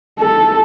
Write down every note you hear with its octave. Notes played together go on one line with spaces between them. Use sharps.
A4